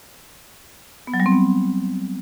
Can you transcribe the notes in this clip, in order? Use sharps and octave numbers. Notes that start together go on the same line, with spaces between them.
B3
F#3
G3
C4
B3